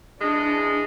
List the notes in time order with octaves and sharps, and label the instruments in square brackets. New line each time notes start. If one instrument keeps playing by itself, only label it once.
[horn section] E3 G#3 [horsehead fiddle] D4